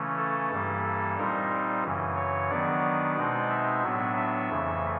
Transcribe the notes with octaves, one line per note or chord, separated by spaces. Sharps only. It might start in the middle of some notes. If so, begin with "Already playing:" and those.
Already playing: C#3 E3 A3 C#4
A4
G2 E3 G3 A#3
A4
A#2 G3 C4 D#4 A#4
F#2 C#3 E3
C#5
D#3 F#3 B3 D4 D5
B2 G#3 C4 D#4
E5
A2 F#3 B3 D4
E5
F2 C#3 E3 A3